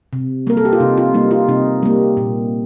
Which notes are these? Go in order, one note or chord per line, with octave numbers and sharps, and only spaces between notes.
C3
G3 A#3 A#4
A4
G4
F4
C3 D#4
F4
G3 A#3 D#4
F4
C3 D#4
G3 A#3
A#2